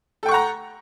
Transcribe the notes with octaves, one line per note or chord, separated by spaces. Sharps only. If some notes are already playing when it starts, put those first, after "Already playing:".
A4 F#5 G5 A#5 C#6